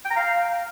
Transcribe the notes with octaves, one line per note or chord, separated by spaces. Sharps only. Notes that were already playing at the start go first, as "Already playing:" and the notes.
G5
A#5
F5